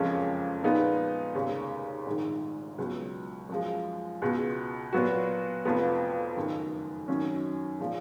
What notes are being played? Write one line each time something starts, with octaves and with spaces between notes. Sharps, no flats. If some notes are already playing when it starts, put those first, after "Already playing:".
Already playing: F#1 F2 F3 G#3 C#4
A#2 F3 G#3 B3 D#4
F1 D#2 C#3
A#1 G#2 D#3
C#2 B2 F#3
F#2 F3 G#3
C#2 B2 G#3
A#2 F#3 B3 F#4
F1 F2 F3 B3
F#1 F#2 D#3
F#2 D#3 F#3 C#4
A#2 F3 G#3